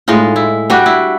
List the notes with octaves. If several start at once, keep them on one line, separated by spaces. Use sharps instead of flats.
A2 G#3 D#4 F4
E4
G3 D4 F#4 G4
E4